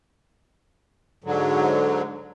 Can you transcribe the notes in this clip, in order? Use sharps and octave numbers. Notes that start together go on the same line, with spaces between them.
G#2 D3 F#3